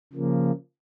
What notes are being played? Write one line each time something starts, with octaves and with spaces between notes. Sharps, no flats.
C#3 F3 A#3